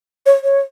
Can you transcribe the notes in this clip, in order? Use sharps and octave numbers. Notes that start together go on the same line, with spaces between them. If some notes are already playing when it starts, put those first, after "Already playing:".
C#5
C#5